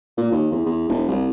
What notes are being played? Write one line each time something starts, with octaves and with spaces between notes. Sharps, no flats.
A#2
D#2
E2
E2
E1
C2